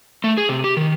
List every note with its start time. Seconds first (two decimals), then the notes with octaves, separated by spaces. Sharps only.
0.24 A3
0.38 G#4
0.49 C3
0.64 G4
0.77 D#3